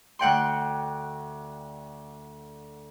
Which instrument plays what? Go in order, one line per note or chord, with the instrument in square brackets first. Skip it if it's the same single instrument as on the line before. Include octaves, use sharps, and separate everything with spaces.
[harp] D2 F#5 G5 C6